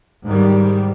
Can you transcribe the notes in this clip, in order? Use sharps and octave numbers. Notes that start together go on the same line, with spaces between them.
G#2 D#3 G3